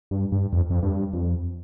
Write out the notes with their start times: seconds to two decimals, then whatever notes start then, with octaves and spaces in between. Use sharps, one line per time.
0.11 G2
0.32 G2
0.53 F2
0.70 F2
0.83 G2
1.13 F2